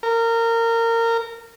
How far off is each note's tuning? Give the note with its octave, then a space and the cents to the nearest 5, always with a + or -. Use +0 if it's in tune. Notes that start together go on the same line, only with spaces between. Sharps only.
A#4 -20